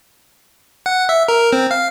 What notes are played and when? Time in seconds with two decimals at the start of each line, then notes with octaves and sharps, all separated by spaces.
0.86 F#5
1.09 E5
1.28 A#4
1.52 C4
1.71 F5